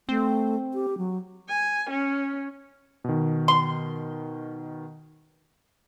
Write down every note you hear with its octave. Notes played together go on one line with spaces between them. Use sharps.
A3 C4
G4
F#3
G#5
C#4
B2 D#3
C6